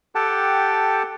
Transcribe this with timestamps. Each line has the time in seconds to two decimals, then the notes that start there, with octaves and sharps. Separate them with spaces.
0.15 G4 A4 F#5 G5 A5